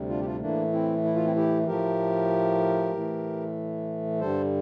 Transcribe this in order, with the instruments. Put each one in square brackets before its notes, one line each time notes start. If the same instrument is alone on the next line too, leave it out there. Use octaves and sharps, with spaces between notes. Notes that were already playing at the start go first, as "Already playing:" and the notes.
Already playing: [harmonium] D2 C3 G3
D4 F4
G4
D4 F4
A2 E3 A3 A#3 D4
C4 E4
E4
F4
C4 E4
E4 G4
A2 F3 A3 G4 A#4
A2 E3 A3
G2 D3 G3 A4 C5